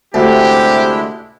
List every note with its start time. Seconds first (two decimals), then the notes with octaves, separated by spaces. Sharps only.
0.14 D2 C3 G#3 D4 E4 G4